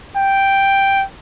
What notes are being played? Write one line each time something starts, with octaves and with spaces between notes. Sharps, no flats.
G5